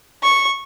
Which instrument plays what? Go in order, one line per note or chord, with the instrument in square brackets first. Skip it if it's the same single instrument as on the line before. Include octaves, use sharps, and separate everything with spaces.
[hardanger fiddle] C#6